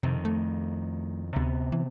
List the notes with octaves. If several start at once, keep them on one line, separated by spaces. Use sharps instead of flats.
F2 C3 D#3
A3
D2 C3 B3
E3